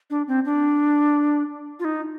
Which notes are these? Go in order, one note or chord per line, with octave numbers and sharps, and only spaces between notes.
D4
C4
D4
F4
D#4